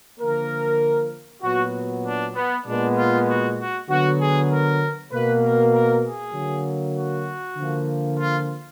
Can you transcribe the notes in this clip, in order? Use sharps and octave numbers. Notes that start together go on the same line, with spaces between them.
D3 F3 A#3 A#4
A#2 F#3 B3 F#4
D4
B3
A#2 G#3 B3 D4
F4
F#4
F#4
D3 F#3 B3 F#4
G#4
A#4
B2 A#3 B4
A#4
A#4
G#4
D3 F#3 A#3
F#4
D3 F3 A#3
F4